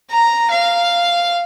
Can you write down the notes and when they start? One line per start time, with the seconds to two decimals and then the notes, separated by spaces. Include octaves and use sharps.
0.11 A#5
0.51 F5